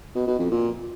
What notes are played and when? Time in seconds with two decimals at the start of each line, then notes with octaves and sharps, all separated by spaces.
0.15 B2
0.27 B2
0.39 F2
0.51 A#2